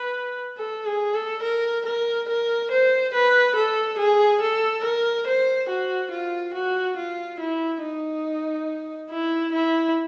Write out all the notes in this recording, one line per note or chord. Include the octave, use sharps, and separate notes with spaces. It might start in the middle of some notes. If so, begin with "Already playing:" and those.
Already playing: B4
A4
G#4
A4
A#4
A#4
A#4
C5
B4
A4
G#4
A4
A#4
C5
F#4
F4
F#4
F4
E4
D#4
E4
E4